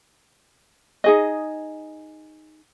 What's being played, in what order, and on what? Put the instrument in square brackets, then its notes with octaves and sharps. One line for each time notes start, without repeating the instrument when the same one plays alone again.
[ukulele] D#4 G#4 D#5